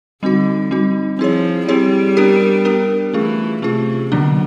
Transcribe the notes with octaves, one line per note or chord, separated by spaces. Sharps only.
D3 G3 C4 D#4 F#4
G3 C4 D#4 F#4
F3 C4 E4 G#4 C#5
G3 C4 E4 G#4 C#5
B3 D4 G4 A#4
B3 D4 G4 A#4
E3 A3 C#4 F4 G#4
C3 A3 C#4 F4 G#4
B2 D3 F#3 A#3 D4